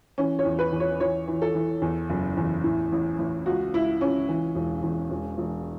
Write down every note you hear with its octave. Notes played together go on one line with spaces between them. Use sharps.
E3 C#4
C#5
E2
B4
E2
C#5
E3 C#5
E3
A4
E3
E2
F#1
E2
A2
A1
A1
C#2 F#4
C#2 E4
C#2 C#4
E3
E1
E2
E1
E1